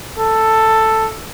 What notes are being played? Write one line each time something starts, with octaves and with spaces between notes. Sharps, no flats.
A4